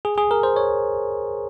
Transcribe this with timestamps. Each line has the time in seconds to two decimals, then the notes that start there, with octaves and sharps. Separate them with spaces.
0.05 G#4
0.18 G#4
0.31 A#4
0.43 C5
0.56 C#5